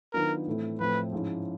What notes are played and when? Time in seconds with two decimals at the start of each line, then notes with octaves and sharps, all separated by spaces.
0.13 D#3 F#3 B3 D4 F4 A#4
0.47 A2 E3 A3 C4 E4
0.79 A2 F3 A3 C4 B4
1.12 G#2 F3 G#3 C#4 E4